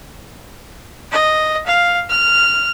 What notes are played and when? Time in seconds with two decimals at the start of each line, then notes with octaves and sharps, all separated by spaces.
1.12 D#5
1.67 F5
2.10 F6